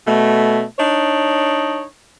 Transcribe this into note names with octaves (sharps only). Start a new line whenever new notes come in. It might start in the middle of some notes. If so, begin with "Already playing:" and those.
B2 A3
D4 D#4 C#5